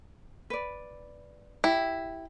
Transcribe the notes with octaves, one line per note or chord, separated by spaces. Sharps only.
B4 D5
E4 G4